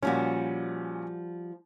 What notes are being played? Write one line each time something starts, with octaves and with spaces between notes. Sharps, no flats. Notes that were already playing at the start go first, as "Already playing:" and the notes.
A#2 F3 G3 C#4 F#4